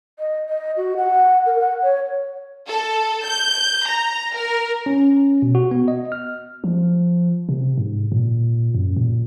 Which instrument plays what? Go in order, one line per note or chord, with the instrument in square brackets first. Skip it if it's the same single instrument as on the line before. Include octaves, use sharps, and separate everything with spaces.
[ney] D#5
D#5
F#4
F#5
A#4
F#5
C#5
[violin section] A4
G6
A#5
A#4
[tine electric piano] C#4
B2
F#4
B3
D#5
F6
[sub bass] F3
C3
G#2
A#2
F#2
A#2